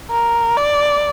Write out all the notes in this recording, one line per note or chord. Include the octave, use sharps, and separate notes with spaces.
A#4
D5